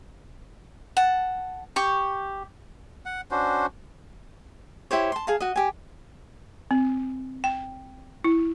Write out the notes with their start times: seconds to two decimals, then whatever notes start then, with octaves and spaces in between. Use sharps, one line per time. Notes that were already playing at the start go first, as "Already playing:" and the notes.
0.97 F#5 A5
1.76 G4 C#6
3.06 F#5
3.31 C#4 D4 F#4 C5
4.91 E4 G4 C5 C#5
5.12 A5 C6
5.27 G#4 F5 A5
5.40 F#4 D#5
5.56 G4 G#5
6.71 C4
7.44 G5
8.24 E4